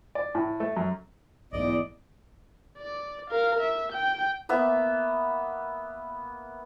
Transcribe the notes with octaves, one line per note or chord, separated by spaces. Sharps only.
D5
A2
A3
F#2
B1 E2 G#2 A3 D5 D#5
D5
A#4 F5
E5
G5
A#3 B3 E5